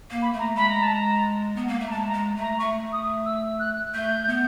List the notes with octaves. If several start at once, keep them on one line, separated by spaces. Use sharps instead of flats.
A#3
B5
A3
A#5
G#3 B5
A#5
A5
A#5
B3
A#3
A3
A#5
G#3 A5
A#5
G#3
A3
A#5
A3 C#6
D#6
E6
F#6
A3 G6
B3